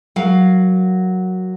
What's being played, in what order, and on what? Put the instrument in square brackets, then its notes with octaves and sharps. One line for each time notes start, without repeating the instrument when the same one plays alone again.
[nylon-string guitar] F#3 A#4 F5